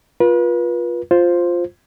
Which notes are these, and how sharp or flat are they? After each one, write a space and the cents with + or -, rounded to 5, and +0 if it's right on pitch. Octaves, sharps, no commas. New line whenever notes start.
F4 +5 B4 -35
F4 +0 C5 +0